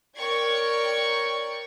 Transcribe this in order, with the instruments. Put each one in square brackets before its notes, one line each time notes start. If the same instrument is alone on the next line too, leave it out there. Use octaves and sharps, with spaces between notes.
[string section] A#4 C#5 D5 G5 C#6 G#6